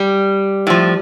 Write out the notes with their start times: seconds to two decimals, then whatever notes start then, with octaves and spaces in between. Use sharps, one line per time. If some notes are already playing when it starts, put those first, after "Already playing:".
Already playing: G3
0.67 A2 F3